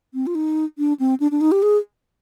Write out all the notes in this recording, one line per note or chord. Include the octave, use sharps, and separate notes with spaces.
C4
F4
D#4
D4
C4
D4
D4
D#4
G4
G#4